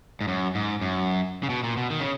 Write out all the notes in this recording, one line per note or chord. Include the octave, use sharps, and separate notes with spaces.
G#2
F#2
G#2
F#2
C#3
B2
A#2
B2
D#3
C#3